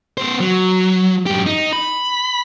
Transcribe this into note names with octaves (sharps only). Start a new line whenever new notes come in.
B3 C5
F#3
F#2 G4
D#4
B5